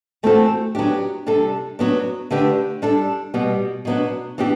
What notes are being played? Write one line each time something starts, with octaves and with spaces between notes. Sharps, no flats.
E3 A3 C4 F#4 A4
F#3 B3 D4 G4
C3 G3 D4 A4
F#3 B3 D4
D3 A3 D4 G4 B4
G3 D4 A4
B2 G3 B3
B2 F#3 B3 D4
E3 B3 D4 G4